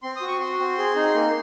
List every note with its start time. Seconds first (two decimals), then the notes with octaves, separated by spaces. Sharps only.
0.03 C4 C6
0.16 D#6
0.21 F#4
0.28 C#6
0.40 F#4 C6
0.59 C4
0.78 G#4
0.96 D#4
1.15 A#3